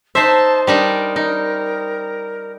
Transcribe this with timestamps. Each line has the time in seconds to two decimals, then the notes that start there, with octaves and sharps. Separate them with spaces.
0.15 D#4 C5 E5 A5
0.67 G3 D4 D#4 A#4
1.16 D#4